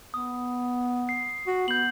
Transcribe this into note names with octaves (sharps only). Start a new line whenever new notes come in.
B3 D#6
C7
F#4
B3 G6 F#7